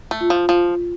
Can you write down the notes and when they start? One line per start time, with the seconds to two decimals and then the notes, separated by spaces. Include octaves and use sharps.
0.11 A3
0.21 F4
0.30 F3
0.49 F3 F4